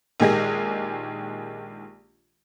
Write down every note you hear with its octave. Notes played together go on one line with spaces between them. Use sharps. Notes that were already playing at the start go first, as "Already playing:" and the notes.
A#1 D#3 G#3 G4 G#4 A#6